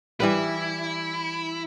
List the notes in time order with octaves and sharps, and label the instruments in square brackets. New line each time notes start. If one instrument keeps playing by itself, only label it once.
[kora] E3 G3 B4 [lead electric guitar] E4